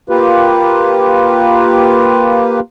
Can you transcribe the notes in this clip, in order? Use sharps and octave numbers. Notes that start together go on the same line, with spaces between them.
A#3 F4 G4 B4